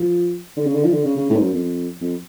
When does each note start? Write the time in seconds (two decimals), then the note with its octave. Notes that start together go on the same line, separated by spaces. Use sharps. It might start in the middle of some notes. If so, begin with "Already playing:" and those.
Already playing: F3
0.56 D3
0.66 C#3
0.75 D3
0.84 F3
0.92 D3
1.05 C#3
1.17 C#3
1.30 A2
1.36 G#2
1.41 F#2
1.53 F2
2.01 F2